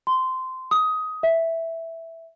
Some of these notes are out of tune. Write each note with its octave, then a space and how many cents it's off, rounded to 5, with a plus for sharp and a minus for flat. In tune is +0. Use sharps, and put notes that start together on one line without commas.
C6 -15
D#6 +15
E5 +0